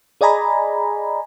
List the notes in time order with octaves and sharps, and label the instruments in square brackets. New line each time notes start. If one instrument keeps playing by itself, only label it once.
[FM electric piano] G#4 D5 D#5 G#5 A#5 B5